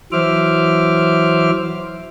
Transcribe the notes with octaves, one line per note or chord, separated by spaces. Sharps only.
E3 F#3 C5 E5 D6 F6